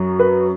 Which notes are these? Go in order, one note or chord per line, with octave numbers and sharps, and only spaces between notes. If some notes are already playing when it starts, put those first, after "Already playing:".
Already playing: F#2 F#3
B4